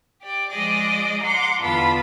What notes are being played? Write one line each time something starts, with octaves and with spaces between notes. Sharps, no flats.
G4 D5
F3 G#3 G#4 D5 D#5
F#5 A#5 C6 D6
E2 D3 B3 F4 A5 B5